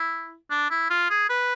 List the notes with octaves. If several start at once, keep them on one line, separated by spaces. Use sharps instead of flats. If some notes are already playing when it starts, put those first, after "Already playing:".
Already playing: E4
D4
E4
F4
G#4
B4